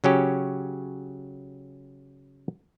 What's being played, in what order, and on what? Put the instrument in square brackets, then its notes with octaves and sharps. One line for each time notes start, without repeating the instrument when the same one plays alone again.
[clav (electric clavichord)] C#3 F#3 C#4 G4